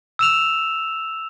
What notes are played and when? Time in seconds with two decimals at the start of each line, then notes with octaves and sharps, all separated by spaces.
0.19 E6 E7 F7